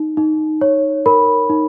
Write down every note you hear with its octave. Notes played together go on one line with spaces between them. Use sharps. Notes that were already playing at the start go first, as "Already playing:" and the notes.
Already playing: D#4
D#4
C#5
A#4 B5
D#4